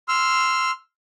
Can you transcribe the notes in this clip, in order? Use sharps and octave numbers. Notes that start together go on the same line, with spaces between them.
C6 E6 F6